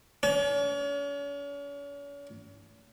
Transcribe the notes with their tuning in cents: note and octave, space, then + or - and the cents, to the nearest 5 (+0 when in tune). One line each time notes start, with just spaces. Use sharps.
C#4 +40